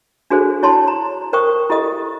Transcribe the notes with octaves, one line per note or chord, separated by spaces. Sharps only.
D4 F#4 G#4 A4 C5
E4 C#5 A5 C6
A#5
A#4 C5 G5 C#6 D#6
E4 G4 A4 D#5 D#6